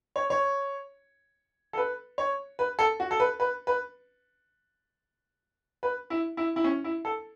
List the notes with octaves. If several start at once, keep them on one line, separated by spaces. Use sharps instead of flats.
C#5
C#5
A4
B4
C#5
B4
A4
F#4
A4
B4
B4
B4
B4
E4
E4
E4
C#4
E4
A4